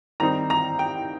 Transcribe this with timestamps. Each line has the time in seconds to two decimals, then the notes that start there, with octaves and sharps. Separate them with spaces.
0.20 D#3 G3 C4 D#4 A#5
0.50 A#5
0.79 G5